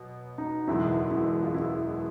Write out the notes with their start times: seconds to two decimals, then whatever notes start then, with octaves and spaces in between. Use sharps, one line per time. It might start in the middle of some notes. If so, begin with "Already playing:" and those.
Already playing: B2 F#3
0.38 D#4
0.67 F#1 E2 B2 G#3 E4
1.11 E4
1.43 F4
1.55 E4